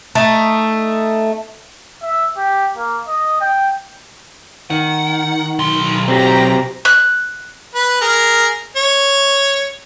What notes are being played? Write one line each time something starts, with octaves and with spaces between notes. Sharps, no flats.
A3 D#4
E5
G4
A#3
D#5
G5
D#3 F#5
B1 C6
F#3 C4 G4 A#5
F#6
B4
G#4 A#4
C#5